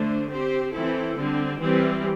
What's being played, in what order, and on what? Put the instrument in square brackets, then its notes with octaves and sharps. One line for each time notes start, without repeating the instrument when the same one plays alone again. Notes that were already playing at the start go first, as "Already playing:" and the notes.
Already playing: [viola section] D3 A3 D4 C5
C4 G4 C5
E3 C4 E4 A4
D3 G3 C4
E3 G3 C4